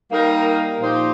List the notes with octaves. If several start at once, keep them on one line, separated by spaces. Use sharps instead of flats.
G3 A#3 D#4 A#4
A#2 F3 D#4 G4 C5